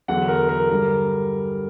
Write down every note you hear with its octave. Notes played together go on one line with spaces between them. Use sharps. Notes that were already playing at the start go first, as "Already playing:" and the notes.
E2 D3 F#3 F#5
A#4
A#4
G2 D3 G3 A#4